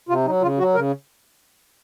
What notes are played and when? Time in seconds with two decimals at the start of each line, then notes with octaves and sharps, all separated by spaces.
0.09 C3 F4
0.26 F#3 D#4
0.42 C#3 F4
0.58 F#3 F#4
0.75 C#3 A#4